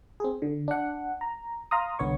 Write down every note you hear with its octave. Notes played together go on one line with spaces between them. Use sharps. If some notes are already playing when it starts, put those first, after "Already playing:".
C4 G#4
D3
D4 F#5
A#5
F5 A#5 C6 D#6
C2 D3 B3 C#5 C#6